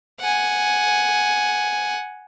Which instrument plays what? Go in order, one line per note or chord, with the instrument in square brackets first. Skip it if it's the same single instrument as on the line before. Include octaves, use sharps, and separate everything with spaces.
[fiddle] F#5 G#5